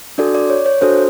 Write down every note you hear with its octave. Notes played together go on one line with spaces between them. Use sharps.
D4 F#4 A4 D5
D5
C#5
C#5
D4 F#4 A4 C5